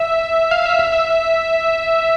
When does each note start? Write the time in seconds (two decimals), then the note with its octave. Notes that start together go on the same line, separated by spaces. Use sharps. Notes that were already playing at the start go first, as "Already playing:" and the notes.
Already playing: E5
0.51 F5
0.66 E5
0.79 E5
0.92 E5